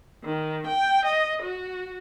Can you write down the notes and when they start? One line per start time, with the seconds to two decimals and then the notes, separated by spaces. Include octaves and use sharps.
0.24 D#3
0.67 G5
1.05 D#5
1.42 F#4